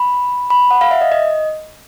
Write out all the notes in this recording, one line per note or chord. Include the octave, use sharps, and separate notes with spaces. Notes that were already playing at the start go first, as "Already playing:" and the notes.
Already playing: B5
B5
F#5
F5
E5
D#5
D#5